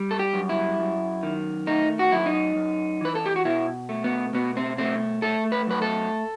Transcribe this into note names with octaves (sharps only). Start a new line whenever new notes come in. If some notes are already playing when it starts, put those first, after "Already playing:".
Already playing: G3
A4
G4
F#2
E4
F#2
D#3
A3 D#4
F#4
F#2 E4
D#4
F#2
E3 B4
A4
G4
F#4
B2 E4
A3
B3
B2 B3
C4
A3 C4
A3 A4
B4
F#2 B4
A4